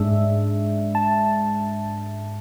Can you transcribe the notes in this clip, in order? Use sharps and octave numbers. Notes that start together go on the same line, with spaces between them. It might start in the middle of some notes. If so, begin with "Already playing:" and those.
Already playing: G#2 G#3 D4 E5
A5